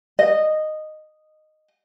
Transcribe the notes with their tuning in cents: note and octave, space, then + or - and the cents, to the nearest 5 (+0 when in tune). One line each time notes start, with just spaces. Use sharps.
D#5 -10